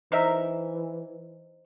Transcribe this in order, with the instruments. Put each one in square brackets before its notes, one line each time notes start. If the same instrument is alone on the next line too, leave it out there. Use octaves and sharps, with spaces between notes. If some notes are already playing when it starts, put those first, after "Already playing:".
[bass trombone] E3 [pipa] D#4 A#4 E5 [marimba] C5